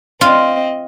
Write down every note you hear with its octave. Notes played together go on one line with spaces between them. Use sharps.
C4 F4 D#5